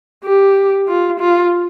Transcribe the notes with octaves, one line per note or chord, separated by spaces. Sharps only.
G4
F4
F4